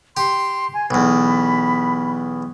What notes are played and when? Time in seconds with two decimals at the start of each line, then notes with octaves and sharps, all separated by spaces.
0.17 G4 C6
0.74 G#5
0.91 B1 E2 B5